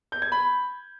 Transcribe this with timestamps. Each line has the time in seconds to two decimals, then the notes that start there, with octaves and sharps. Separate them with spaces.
0.12 G6
0.22 G#6
0.32 B5